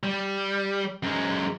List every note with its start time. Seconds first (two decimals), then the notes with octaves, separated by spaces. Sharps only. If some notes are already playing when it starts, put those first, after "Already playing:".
0.03 G3
1.03 F#2 G#3